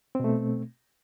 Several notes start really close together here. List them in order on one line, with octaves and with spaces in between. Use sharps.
C4 B2 A3